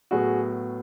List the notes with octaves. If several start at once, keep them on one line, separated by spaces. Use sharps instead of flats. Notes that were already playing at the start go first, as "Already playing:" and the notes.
A2 F#3 B3 F#4 G#4